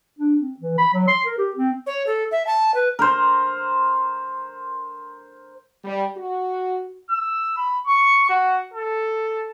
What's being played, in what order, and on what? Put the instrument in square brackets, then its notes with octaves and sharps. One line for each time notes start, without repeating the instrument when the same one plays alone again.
[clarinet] D4
C4
E3
B5
F#3
C6
A#4
G4
C4
[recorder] C#5
A4
E5
A5
B4
[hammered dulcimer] A#4 C5
[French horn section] G3
F#4
[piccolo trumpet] E6
B5
C#6
F#4
A4